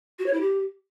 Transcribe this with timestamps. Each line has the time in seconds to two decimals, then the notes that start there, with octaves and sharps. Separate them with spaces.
0.19 F#4
0.26 C#5
0.33 E4
0.40 G4